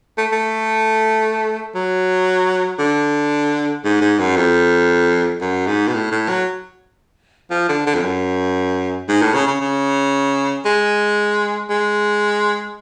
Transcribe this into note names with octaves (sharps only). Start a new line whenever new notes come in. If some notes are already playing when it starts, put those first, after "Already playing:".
A3
A3
F#3
D3
G#2
G#2
F#2
F2
F#2
G#2
B2
A2
A2
F#3
F3
D3
D3
F2
F#2
G#2
A2
C#3
C#3
C#3
G#3
G#3